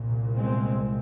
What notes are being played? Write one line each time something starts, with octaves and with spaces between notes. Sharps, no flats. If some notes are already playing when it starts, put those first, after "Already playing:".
Already playing: C2 A#2
G#3 C4